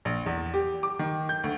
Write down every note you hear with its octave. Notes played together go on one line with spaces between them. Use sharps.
A#1
E2
G4
D6
D#3
G6
D2